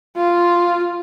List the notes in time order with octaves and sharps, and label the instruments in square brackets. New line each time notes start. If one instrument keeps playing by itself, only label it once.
[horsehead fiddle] F4